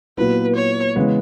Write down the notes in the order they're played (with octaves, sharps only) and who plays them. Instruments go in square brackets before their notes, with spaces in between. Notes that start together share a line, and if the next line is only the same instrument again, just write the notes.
[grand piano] A#2 F#3 B3 E4 [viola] B4
[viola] C#5
[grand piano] C#3 E3 G#3 B3